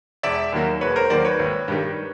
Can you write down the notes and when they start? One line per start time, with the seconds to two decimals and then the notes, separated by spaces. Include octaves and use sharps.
0.23 E1 D5 E5
0.52 D#2 D#3 F#3 A#3
0.81 E1 B4 C#5
0.96 A#4 C5
1.10 D#2 D#3 F#3 A#3 C5 D5
1.25 B4 C#5
1.39 G#1
1.68 G2 D#3 G3